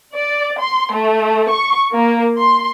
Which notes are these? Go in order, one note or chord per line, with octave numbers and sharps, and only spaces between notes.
D5
C6
A3
C#6
A#3
C6